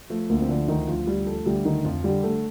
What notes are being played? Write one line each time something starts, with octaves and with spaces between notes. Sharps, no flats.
F3 A3
D2 A#3
C4
D3 F3 D4
D2 D#3 D#4
D2 F3 F4
F3 G3 G4
F3 A3 A4
D2 G3 G4
D3 D#3 D#4
F2 F3 F4
D3 G3 G4
D3 A3 A4